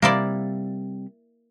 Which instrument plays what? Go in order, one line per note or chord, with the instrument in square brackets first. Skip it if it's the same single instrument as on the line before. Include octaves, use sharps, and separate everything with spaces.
[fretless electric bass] C3 G3 [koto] A#3 E4 D5